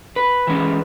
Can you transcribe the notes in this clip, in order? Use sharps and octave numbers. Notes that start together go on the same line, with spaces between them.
B4
E3 G#3 C#4